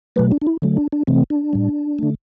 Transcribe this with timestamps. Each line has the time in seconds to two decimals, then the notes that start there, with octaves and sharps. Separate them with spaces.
0.16 B2 F#3 A3 B4
0.31 D4
0.41 D4
0.47 E4
0.62 D3 F#3 A3
0.77 D4
0.92 D4
1.07 C3 E3 A3 C4
1.30 D4
1.53 A2 G3
1.99 D3 A3